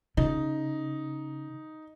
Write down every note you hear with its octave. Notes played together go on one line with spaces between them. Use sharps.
C#3 D#4